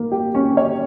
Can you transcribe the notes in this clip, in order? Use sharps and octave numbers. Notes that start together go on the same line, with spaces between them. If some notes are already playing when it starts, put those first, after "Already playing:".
Already playing: A#3
G4
C#4
C#5